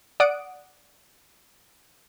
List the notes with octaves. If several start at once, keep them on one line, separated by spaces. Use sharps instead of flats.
D5 F#5 D#6 D7